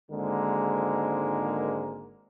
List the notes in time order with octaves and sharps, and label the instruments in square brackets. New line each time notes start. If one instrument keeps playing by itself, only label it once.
[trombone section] G#1 G#2 D3 G#3 A#3 A#4